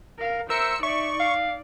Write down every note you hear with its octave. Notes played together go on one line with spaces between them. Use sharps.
A#4 F5
A#4 C5 E5 E6 C#7
D#4 D5 E5 C#6
F5